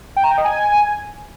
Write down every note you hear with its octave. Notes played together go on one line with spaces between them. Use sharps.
G5
A#5
G5
D#5
G#5